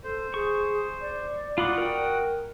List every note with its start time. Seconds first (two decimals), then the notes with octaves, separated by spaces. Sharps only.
0.04 A4 C5
0.34 G#4 C#6
1.01 D5
1.58 F4 F#4 F#5 B5 D6 D#6
1.78 A#4 G5